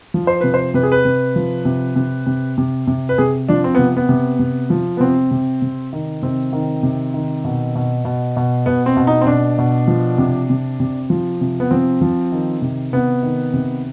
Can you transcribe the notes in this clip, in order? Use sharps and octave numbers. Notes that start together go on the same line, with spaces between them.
F3
C5
C3 B4
C5
C3 B4
G#4
B4
C3
F3
C3
C3
C3
C3
C3
B4
C3 G#4
F3 D4
C4
C3 B3
B3
C3
C3
F3
B3
C3 C4
C3
C3
D#3
C3 C4
D#3
C3
D#3
B2
B2
B2
B2
B2 B3
C4
B2
D#4
C4
B2 D4
B2
F3
C3
C3
C3
F3
C3
B3
F3 C4
F3
D#3
C3
C3 B3
D#3
C3